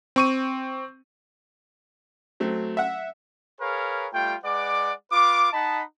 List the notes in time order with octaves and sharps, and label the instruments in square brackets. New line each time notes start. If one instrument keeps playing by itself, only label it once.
[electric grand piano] C4 C#6 D#7
[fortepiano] F#3 A3 C4
E5 F#5
[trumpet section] G#4 A#4 B4 C#5 F5
G3 A3 F4 G5
G#3 B4 D5 F#5 D6
F4 B4 D6
D#4 D#5 F#5 A5 B5